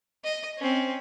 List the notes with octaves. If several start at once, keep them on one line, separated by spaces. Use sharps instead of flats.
D#5
C4 C#4